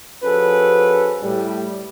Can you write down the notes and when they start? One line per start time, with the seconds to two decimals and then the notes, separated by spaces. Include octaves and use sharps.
0.23 F3 C#4 F#4 G#4 A4 B4
1.21 A2 G3